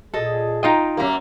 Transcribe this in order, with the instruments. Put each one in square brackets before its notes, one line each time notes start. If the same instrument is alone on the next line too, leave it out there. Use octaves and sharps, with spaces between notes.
[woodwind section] A#2 G#4 [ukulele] A4 D#5
[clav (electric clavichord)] D#4 F4 D#5 [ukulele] G5 A#5
[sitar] F#2 A#3 [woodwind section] F#3 G4